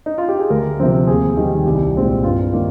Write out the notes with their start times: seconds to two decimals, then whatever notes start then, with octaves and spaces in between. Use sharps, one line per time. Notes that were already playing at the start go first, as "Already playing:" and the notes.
0.06 D#4
0.18 F4
0.29 G4
0.39 G#4
0.50 D2 A#4
0.80 C3 F3 C4
1.07 D#2 G#4
1.37 D#3 G3 A#3
1.66 C2 G4
1.96 A#2 G#3 C4
2.24 G2 F4
2.53 D#3 A#3